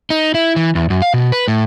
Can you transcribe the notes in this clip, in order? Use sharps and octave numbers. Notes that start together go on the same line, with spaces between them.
D#4
E4
E3
E2
F#2
F5
B2
B4
A2